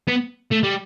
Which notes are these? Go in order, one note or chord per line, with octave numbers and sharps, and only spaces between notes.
B3
A3
G3